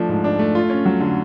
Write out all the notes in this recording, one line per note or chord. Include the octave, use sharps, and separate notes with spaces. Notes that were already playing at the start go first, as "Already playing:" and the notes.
Already playing: F3 A3 D4
G#2
D4
A3
F4
C#4
F#3
D3